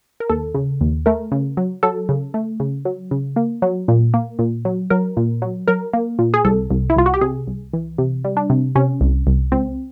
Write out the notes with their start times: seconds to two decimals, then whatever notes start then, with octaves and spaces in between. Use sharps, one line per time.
0.20 A#4
0.29 D#2 A4
0.55 C#3
0.81 D#2
1.06 A3 A#4
1.32 C#3
1.57 F#3
1.83 F#3 A4
2.09 C#3
2.34 A3
2.60 C#3
2.85 F#3
3.11 C#3
3.36 A#3
3.62 F#3
3.88 A#2
4.14 A#3
4.39 A#2
4.65 F#3
4.90 F#3 A#4
5.17 A#2
5.42 F#3
5.68 F#3 A#4
5.93 A#3
6.19 A#2
6.34 G#4
6.45 C2 A4
6.70 C2
6.90 E4
6.96 C2 F4
7.06 F#4
7.14 G4
7.21 C3 G#4
7.47 C2
7.73 E3
7.98 C3
8.25 G3
8.37 D4
8.50 C3
8.75 C3 C#4
9.01 C2
9.27 C2
9.52 C#2 C4